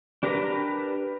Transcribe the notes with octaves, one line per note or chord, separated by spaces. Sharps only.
D4 G4 A#4 B4 A#5